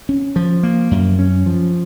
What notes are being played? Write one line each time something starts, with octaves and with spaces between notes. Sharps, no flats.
C#4
F3
A#3
F#2
C#4
F3